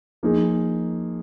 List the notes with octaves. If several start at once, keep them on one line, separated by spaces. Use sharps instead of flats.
F3 A#3 D#4 G#4